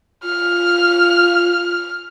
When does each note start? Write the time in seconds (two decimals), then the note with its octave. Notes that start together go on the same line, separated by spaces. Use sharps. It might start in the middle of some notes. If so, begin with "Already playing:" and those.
0.25 F4 F6